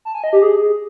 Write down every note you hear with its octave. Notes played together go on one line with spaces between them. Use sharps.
A5
G#5
D#5
G4
G#4